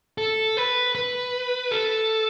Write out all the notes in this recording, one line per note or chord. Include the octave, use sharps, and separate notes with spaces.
A4
B4
B4
A4